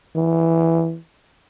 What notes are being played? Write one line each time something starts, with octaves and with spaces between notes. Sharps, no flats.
E3